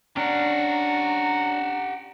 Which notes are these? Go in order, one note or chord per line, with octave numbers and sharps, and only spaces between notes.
C#4 D4 G4 F#5 A#5